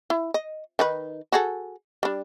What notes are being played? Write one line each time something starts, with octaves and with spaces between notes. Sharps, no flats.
E4
D#5
D#3 D#4 B4
F#4 G#4 A4
G3 D4